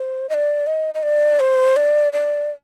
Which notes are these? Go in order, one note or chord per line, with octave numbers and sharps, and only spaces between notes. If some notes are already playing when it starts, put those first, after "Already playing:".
Already playing: C5
D#5
D5
D#5
D#5
D5
C5
D5
D5